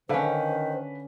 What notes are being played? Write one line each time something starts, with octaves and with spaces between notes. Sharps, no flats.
D3 D#3 C#4 B4 C5 F5 A5